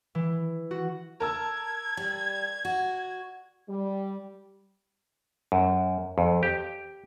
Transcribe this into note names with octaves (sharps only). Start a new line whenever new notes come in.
E3
F#4
A#4 A5 E6 G#6
G3
F#4
G3
F#2
F2
G4